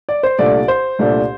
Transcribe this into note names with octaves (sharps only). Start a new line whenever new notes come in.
D5
C5
C2 A#2 A3 D4 D5
C5
C2 A#2 A3 D4